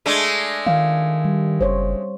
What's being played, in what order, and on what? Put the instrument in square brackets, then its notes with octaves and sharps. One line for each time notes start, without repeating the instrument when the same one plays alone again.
[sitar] G#3 A3 D4
[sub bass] D#3 [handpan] F5
[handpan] G3
[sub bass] F#1 [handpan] C5 C#5